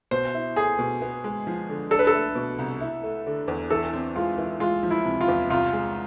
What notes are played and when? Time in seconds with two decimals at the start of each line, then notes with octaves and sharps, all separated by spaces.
0.11 B2 C5
0.34 E4
0.56 A3 G#4
0.79 B2
1.01 B3
1.24 G#3
1.47 F3
1.69 D3
1.91 D4 A4
1.99 B4
2.07 A4
2.14 A3
2.35 B2
2.58 C2
2.81 E4
3.03 A3
3.26 D3
3.48 E2
3.70 E3 A4
3.93 C4
4.16 G#3 F4
4.38 E3
4.60 G#3 F4
4.83 F3
4.91 E4
5.05 C3
5.21 F4
5.28 E2
5.50 C2 F4
5.73 G#3